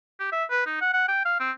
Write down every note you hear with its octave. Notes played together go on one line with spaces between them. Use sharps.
G4
E5
B4
D#4
F#5
F#5
G5
F5
C4